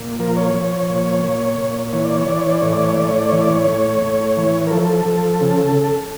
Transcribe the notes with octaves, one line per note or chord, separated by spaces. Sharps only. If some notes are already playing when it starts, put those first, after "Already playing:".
Already playing: A#2
F3 A#4
C#5
F3
A#2
A#2
A#2
E3 C#5
D5
C#5
E3 D5
C#5
D5
A2 C#5
D5
C#5
A2 D5
C#5
D5
E3 C#5
D5
C#5
A2
A2
E3
A#4
F3 A4
F3
C#3